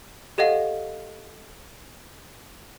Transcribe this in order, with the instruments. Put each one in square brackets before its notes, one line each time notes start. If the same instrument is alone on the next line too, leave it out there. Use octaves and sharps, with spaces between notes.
[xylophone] G4 A4 D#5 F5 F#5